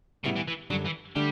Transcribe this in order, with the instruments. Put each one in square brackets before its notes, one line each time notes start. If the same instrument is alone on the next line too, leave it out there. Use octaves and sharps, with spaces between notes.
[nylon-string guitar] A2 G3 B3 E4 [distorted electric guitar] C#3
[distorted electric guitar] E3
E3
[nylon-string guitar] F#2 D3 G3 D4 [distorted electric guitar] F#3
[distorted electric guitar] E3
[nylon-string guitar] D3 A3 D4 [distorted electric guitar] G3